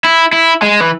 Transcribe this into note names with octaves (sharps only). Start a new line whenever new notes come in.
E4
E4
G#3
E3